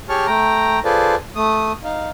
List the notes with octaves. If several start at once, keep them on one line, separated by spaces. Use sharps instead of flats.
G4 G#4 C#5 A5 C#6 F6
A3 G5 A#5
F4 G#4 A4 B4 C5 D5
A3 D#6
D#4 F5